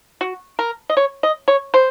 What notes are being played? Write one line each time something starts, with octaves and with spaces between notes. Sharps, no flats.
F#4
A#4
D#5
C#5
D#5
C#5
C5